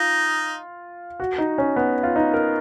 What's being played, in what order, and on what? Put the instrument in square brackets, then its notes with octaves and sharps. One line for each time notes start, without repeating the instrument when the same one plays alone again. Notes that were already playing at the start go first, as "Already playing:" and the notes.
Already playing: [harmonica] D#4 [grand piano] F4
[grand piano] F#4
D#4
C#4
B3
F4
D#4
A#4